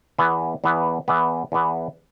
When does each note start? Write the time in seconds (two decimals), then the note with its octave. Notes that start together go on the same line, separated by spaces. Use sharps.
0.19 E2 E3 B3
0.64 E2 E3 B3
1.08 E2 E3 B3
1.52 E2 E3 B3